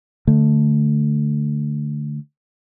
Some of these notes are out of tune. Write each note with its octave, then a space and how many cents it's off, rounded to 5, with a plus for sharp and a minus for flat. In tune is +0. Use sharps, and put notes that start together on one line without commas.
D3 +0 A3 +0